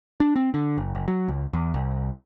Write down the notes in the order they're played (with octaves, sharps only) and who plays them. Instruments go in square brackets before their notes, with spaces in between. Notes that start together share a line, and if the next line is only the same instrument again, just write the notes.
[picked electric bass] D4
C4
D3
F#1
F#1
F#3
C#2
E2
C2